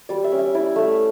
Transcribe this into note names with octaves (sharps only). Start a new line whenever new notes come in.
G3 D5
E5
C#4
E5
E4 D5
A3